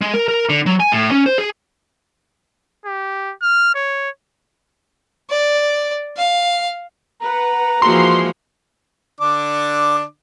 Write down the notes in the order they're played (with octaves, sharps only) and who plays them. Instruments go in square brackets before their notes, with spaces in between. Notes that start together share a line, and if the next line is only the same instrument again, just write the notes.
[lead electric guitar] G#3
A#4
A#4
D3
F#3
G#5
A2
C#4
C5
G#4
[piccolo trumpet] G4
F6
C#5
[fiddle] D5
F5
[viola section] B4 F#5 [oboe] A#5
[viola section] E3 G#3 E4 [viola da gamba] F3 A#3 F#4 [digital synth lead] C6
[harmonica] D3 D4 D6